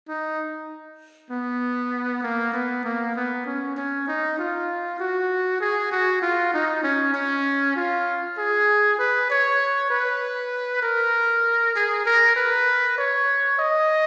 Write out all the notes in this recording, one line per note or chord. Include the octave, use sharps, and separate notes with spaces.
D#4
B3
A#3
B3
A#3
B3
C#4
C#4
D#4
F4
F#4
G#4
F#4
F4
D#4
C#4
C#4
F4
G#4
B4
C#5
B4
A#4
G#4
A#4
B4
C#5
D#5